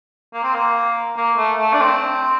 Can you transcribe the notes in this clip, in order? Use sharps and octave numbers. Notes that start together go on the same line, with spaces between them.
A#3
C4
A#3
A#3
A3
A3
D4
C4